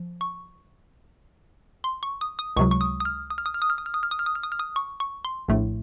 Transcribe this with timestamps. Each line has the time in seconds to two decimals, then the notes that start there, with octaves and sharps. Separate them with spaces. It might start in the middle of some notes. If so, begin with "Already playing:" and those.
Already playing: F3
0.21 C#6
1.84 C6
2.03 C#6
2.21 D#6
2.39 D#6
2.56 C#2 C3 F#3 C#6
2.71 C#6
2.81 D#6
3.00 D#6
3.05 F6
3.30 D#6
3.38 F6
3.46 D#6
3.54 F6
3.62 D#6
3.70 F6
3.78 D#6
3.86 F6
3.94 D#6
4.03 F6
4.11 D#6
4.19 F6
4.26 D#6
4.35 F6
4.43 D#6
4.52 F6
4.59 D#6
4.76 C#6
5.00 C#6
5.25 C6
5.48 A#1 A2 A3